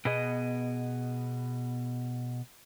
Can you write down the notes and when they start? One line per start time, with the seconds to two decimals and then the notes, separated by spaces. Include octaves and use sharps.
0.05 B2 B3 G#4 D#5